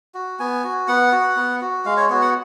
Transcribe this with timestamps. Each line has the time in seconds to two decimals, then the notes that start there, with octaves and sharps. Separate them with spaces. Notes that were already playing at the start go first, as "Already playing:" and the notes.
0.15 F#4
0.39 B3 G#5
0.64 F#4
0.88 B3 F#5
1.12 F#4
1.36 B3
1.62 F#4
1.85 G#3 F5
1.97 C#5
2.10 B3 F#4 C#5
2.22 F#5